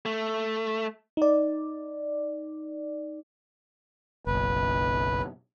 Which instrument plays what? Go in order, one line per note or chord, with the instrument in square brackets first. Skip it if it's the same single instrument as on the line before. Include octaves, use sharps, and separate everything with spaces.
[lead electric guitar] A3
[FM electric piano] D#4 D5
[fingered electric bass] F#1 B1 [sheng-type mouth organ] B4